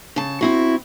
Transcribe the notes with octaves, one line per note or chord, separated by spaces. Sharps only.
C#3 A5
C4 E4 F#4